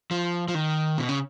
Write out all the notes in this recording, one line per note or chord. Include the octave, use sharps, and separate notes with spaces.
F3
F3
D#3
B2
C#3